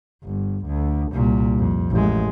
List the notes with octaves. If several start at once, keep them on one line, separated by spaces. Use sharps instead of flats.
G1
D2
C2 A#2
F2
A1 G#3